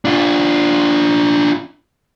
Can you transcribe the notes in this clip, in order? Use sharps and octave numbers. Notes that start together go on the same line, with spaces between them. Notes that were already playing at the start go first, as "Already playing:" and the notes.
D4 F4